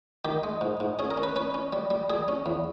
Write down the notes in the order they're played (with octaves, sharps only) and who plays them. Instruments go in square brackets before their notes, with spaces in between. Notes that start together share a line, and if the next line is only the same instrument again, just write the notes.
[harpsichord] D#3 G4
G#3
G#2
G#2
C#4 G#4
A#4
C#4
B4
C#4 B4
C#4
G3
G3
G3 G#4
C#4
E2